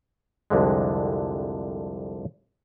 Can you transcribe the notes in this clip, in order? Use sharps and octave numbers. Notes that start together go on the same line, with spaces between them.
C2 F2 D3 G#3